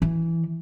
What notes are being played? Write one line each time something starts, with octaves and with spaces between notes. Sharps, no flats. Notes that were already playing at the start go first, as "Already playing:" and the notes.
E3